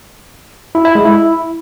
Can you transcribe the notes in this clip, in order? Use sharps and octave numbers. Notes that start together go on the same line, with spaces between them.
E4
E4
G#3
E4